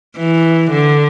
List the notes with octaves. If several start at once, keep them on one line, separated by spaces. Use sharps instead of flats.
E3
D3